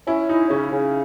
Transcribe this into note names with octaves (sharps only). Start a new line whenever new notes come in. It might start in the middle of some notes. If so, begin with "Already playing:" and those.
C#4 E4
D#4 E4
C#3 C#4
C#3